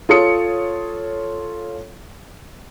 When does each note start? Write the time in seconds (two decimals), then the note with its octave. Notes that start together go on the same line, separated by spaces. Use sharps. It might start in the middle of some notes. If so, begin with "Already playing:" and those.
0.09 F4 A4 C#5 D#6 C#7